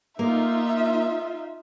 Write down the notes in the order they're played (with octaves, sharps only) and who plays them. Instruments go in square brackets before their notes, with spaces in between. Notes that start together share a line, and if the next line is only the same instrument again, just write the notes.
[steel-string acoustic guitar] A#3 [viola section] D#4 F4 [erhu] E5